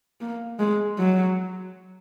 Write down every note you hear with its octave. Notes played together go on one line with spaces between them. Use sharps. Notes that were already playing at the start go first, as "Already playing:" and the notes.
A#3
G#3
F#3